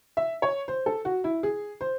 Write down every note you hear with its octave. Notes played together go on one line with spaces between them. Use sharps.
E5
C#5
C5
A4
F#4
E4
G#4
C5